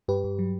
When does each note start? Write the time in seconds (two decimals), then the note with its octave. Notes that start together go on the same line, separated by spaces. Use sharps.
0.08 G2 G4 B4
0.24 G2
0.39 F#3